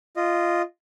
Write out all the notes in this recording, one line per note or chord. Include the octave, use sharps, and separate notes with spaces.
F4 D#5